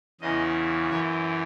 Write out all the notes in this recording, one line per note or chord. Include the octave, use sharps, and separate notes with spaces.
E2 C#3 E3 D#5
F#2 E3 C#5